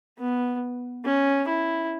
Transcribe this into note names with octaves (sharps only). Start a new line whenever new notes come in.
B3
C#4
E4